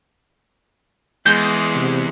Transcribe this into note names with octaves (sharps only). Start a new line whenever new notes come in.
E2 G#3 G6
C3